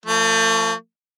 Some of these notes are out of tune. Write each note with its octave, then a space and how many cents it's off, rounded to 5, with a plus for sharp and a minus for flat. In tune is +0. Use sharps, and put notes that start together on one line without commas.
F3 +0 A3 +40